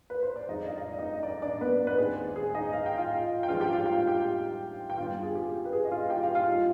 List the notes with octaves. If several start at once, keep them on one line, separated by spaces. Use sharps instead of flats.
B4
C5
D5
F2 D3 G#3 D#4 D#5
F5
D#5
D5
D#4 D#5
D#5
D4 D5
D4 D5
B3 B4
B4
D#2 D#3 G#3 C4 G#4
G#4
D#4 D#5
F5
G5
F4 F5
G5
G#2 F3 G#3 D4 F4 F5
G4 G5
F4 F5
G5
G4 G5
G5
G1 G2 D3 F4 F5
G#4
G4
B4
G#4
D#5
F4 F5
G4 G5
F4 F5
F4 F5
G#2 G3 D4